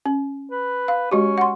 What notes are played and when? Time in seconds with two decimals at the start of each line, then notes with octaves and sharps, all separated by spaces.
0.06 C#4
0.51 B4
0.88 F5
1.11 G#3 C#4 F#4 G4
1.38 F#5 C6